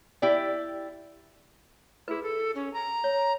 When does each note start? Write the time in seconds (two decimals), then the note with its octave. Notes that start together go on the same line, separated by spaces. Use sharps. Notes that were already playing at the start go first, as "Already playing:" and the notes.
0.22 E4 G4 D5
2.08 E4 G#4 B4
2.23 A4
2.55 C#4
2.73 A#5
3.04 C#5